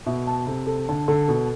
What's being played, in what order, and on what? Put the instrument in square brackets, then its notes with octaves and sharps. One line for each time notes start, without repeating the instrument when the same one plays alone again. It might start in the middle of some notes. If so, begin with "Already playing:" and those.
[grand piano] B2 [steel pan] E5
[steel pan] A5
[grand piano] C3 [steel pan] A4
[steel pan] A4
[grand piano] D3 [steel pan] A5
[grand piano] D3 [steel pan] A4
[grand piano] B2 [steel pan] A4